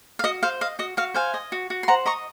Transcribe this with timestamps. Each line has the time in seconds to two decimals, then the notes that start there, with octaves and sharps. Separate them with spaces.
0.19 F5
0.24 F#4 D#5
0.43 C5 F5
0.61 D#5 F5
0.79 F#4 D#5
0.97 F#4 F5
1.14 C5 F5 G#5
1.34 D#5
1.52 F#4
1.70 F#4
1.83 C6
1.88 C5 F#5 A#5
2.06 D#5 A#5 C#6